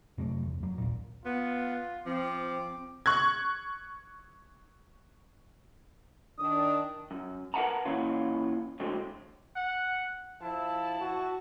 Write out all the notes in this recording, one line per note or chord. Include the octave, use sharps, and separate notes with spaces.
F2 C3 F#3 A3
F#1 E2
F#3
A#1 D#2 A#2
B3 F4
F3 C4 D6
C#6 F#6 G#6
D#3 D4 D#6
F#2
A#4 B4 F5 F#5 A5 A#5
A#2 E3 C#4 F4
A2 D3 F#3 G#3 C4
F#5
F3 E4 A5
F#4